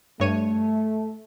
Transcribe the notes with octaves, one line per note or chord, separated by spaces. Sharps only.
G2 A3 C#5 D#7